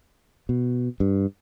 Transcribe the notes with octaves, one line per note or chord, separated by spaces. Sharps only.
B2
G2